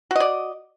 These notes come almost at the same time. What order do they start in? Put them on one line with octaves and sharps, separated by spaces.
F#4 D#5 D5